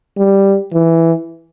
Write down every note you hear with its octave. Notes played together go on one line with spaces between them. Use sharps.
G3
E3